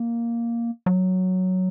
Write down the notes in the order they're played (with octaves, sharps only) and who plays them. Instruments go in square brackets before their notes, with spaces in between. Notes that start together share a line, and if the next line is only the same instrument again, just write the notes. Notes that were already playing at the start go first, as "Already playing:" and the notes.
Already playing: [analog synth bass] A#3
F#3